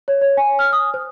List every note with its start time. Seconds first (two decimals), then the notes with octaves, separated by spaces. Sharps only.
0.08 C#5
0.21 C#5
0.37 G#5
0.59 F6
0.73 D#6
0.94 C5